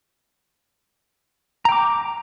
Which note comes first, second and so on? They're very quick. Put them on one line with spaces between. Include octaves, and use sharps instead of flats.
A#5 G5 D6